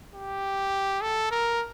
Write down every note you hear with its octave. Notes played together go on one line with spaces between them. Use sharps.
G4
A4
A#4